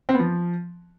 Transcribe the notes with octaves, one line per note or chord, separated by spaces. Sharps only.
C4
B3
F3